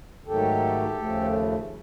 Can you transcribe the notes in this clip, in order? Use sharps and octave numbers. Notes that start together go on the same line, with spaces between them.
G#2 D#3 F#3 A3 G4 A4
D#2 C#3 F3 A3